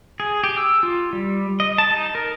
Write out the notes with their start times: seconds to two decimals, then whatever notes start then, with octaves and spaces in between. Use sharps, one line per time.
0.20 G#4
0.44 G4
0.57 E6
0.83 F4
1.13 G3
1.60 D#5
1.78 A5
1.91 D#4
2.15 A#4